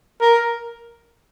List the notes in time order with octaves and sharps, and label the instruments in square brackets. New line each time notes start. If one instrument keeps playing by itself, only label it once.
[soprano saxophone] A#4